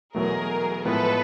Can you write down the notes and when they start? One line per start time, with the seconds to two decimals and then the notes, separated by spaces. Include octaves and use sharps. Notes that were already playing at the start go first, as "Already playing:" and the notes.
0.15 E2 B2 F#3 A3 G#4 A#4
0.85 A2 F3 G#3 B3 A4 B4